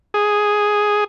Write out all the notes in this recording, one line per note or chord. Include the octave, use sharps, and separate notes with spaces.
G#4